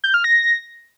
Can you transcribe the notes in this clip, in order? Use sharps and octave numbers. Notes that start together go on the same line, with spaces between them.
G6
F6
A#6